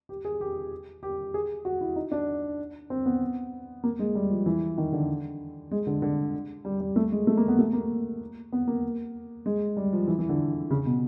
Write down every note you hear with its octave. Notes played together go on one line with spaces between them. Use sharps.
G4
G#4
G4
G4
G#4
F#4
E4
D#4
D4
C4
B3
A#3
G#3
G3
F3
E3
D#3
D3
G#3
D3
D3
G3
G3
A3
G#3
A3
A#3
B3
A3
A#3
B3
A#3
G#3
G3
F3
E3
E3
D3
C#3
B2